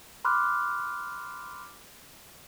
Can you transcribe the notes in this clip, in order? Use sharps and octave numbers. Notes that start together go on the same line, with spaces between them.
B5 C6 D6 F6 F#6